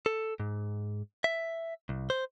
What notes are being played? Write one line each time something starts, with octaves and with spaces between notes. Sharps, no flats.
A4
G#2
E5
C2
C5